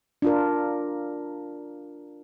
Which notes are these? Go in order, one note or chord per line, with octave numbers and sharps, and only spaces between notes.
D4 F4 A#4